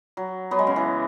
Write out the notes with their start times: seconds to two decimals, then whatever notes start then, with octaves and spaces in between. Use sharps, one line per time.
0.17 F#3
0.51 F#3 B3
0.59 G#3
0.67 C#3
0.76 E3